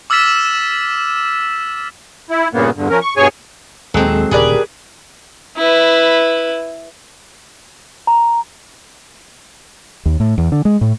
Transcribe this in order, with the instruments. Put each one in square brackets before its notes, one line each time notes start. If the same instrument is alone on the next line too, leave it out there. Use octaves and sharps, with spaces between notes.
[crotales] D6 E6 F6 A6 B6 E7
[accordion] E4
G2 A#2 C#3 A#3 B3
E2 G2 D3
F3 C#4 A#4
C#6
G2 B2 G#4 C#5 G#5 C#6
[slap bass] D#2 A#2 [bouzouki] F#3 C4 [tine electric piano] G#3 G#4 A4
[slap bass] D#1 D2 C#3 [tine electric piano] G4 A#4 [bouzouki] G#4 B4 D5
[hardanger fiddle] E4 B4
[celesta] A#5
[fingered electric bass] D#2
A2
E2
D3
G#3
A2